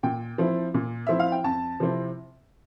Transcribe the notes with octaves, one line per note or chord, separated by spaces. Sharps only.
A#2 G5
F3 C4 E4
A#2
F3 C4 E4 E5
F5
G5
F2 A5
C3 F3 C4 E4